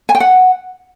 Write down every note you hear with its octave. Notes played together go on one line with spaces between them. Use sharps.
G#5
G5
F#5